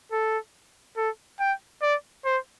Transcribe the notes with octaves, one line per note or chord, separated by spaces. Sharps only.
A4
A4
G5
D5
C5